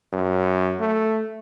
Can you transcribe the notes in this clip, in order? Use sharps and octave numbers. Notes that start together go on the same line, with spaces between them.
F#2
A3